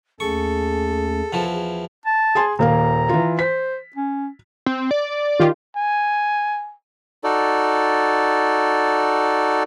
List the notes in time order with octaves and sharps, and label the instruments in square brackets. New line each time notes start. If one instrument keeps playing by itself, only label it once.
[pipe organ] D#2 A3 C#4 [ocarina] G#4 [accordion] A4 [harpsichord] C#6
[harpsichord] E2 F3 E4
[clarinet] A5
[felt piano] G#4 G#5 C6
[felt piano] D#1 A#3 F5 [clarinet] A#5
[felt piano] E3 F4
[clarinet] C5 [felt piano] B6
[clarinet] C#4
[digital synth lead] C4
D5
[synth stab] D#3 F4 G4
[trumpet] G#5
[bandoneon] D#4 F#4 A4 D5